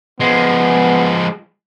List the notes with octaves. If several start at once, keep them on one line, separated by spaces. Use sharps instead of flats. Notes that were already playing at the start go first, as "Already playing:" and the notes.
F3 G#3 B3